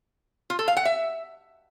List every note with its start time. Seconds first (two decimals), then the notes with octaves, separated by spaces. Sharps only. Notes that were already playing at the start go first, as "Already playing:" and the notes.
0.50 F4
0.59 A4
0.68 F5
0.77 F#5
0.85 E5